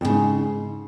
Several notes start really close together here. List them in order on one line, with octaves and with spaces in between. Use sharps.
F2 C#3 G#2